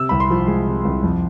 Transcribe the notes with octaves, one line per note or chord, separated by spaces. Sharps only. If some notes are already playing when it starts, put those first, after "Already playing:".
Already playing: C3 E6
C2 B5
C6
F3
G#3
C3
C2
F2